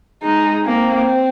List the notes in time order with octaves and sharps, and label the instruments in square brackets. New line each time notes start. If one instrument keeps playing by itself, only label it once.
[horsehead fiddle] G#3 [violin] D#4
[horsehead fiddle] A#3 [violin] C4